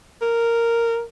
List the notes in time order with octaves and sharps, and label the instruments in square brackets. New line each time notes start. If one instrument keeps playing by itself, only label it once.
[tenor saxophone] A#4